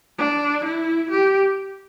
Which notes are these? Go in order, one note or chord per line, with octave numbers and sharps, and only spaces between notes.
D4
E4
G4